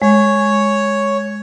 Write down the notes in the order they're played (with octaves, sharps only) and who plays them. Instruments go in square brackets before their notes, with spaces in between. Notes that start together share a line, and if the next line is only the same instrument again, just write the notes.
[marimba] G#3 [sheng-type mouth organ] C#5